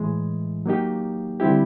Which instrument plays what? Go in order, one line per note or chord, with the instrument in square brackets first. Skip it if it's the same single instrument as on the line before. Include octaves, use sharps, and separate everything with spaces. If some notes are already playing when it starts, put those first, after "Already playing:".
Already playing: [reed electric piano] A2 E3 G#3
F#3 A#3 D#4 G4
D3 G3 C4 E4 G4